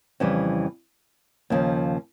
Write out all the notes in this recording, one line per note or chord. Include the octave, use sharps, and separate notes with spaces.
F2 C#3 E3 G3
D#2 C#3 F3